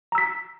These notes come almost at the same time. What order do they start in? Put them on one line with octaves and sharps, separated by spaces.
A#5 E6 B6